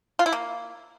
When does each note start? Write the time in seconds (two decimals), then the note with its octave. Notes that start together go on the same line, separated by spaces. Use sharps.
0.19 F4
0.26 E4
0.32 A#3